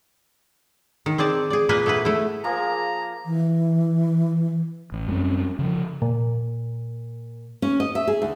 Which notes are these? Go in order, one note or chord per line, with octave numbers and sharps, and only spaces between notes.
D#3
C4 G#4 D5 A5
G#4 D5
A#2 A#3 B4 D#5 G#5
A3 B3 G#4 B4
A3 E4
F3 A#3 G#4 A#5
E3
A1
F#2 G3 C4 C#4
C#3 F3
A#2
C#4
D#5
E5
G#4
D2